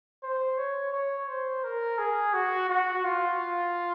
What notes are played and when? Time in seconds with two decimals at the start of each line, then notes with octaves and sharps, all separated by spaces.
0.23 C5
0.58 C#5
0.92 C#5
1.28 C5
1.64 A#4
1.98 G#4
2.34 F#4
2.69 F#4
3.04 F4